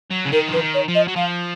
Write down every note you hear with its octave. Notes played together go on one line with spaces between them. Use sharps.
F#3
C#3
D#3 A#4
F3 B4
D#3
C#5
F3
D#5
F#3
F3 F5